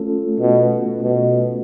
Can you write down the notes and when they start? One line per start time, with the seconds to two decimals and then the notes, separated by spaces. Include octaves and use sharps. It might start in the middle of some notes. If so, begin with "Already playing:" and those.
Already playing: A3 C#4 F4 A4
0.40 B2
1.03 B2